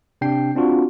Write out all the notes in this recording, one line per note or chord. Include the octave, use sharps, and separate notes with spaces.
C3 D4 G5 C7
C4 D4 F4 F#4